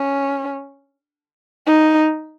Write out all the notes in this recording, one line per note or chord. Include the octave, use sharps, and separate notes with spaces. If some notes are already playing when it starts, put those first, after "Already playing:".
Already playing: C#4
D#4